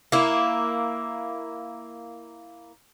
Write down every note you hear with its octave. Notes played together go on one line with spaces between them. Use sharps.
A#3 E4